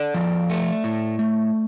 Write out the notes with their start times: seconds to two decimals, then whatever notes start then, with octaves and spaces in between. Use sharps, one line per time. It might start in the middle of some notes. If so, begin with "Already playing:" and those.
Already playing: A4 D5
0.14 F3
0.50 A3
0.84 A2
1.19 A3